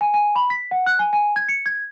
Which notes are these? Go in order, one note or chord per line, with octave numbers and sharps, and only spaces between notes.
G#5
G#5
B5
B6
F#5
F#6
G#5
G#5
G#6
C#7
G#6